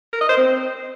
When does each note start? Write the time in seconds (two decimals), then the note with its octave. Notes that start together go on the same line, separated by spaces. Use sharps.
0.13 A#4
0.21 D#5
0.29 C5
0.37 C4